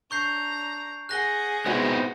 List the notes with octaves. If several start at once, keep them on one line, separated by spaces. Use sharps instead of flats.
D4 A#5 C#6 G6 C7
G#4 F#5 F#6 A#6 G7
G#3 B3 C4 D#4 E4 F#4